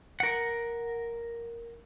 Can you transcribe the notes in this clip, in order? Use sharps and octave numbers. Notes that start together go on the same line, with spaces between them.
A#4 F#5